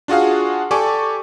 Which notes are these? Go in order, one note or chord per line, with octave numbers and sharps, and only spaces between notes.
D4 F4 F#4 G#4 F5
G4 A4 D5 G#5 C#6 D6